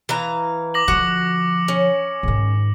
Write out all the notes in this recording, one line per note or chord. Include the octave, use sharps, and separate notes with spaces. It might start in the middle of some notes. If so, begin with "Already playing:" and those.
E3 F5 A#5
D6 A#6 F#7
D3 F3 F#4 D6 C#7 F#7
C#4
G#2 D#3